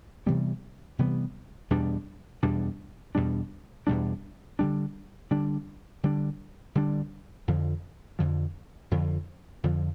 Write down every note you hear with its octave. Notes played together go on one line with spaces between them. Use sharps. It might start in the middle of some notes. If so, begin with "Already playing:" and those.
C3 E3 G3 B3
C3 E3 G3 B3
E2 B2 G3 D4
E2 B2 G3 D4
E2 B2 G3 D4
E2 B2 G3 D4
D3 G3 D4
D3 G3 D4
D3 G3 D4
D3 G3 D4
F2 D3 F3
F2 D3 F3
F2 D3 F3
F2 D3 F3